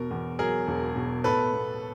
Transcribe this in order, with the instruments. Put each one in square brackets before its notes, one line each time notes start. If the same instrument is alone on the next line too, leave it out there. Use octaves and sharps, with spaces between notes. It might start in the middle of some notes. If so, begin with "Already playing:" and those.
Already playing: [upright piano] E1 B2 [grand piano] A#4
[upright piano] E2
[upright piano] F#3 [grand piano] G#4 A#4
[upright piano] E1
B2
[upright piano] A2 [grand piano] A4 B4
[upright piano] B3